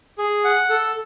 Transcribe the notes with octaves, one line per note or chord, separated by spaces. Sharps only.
G#4
F#5
A4